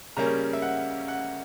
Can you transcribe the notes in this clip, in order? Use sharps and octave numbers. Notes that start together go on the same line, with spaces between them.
C#3 G3 A#3 C#4 A#5
E5
F#5
F#5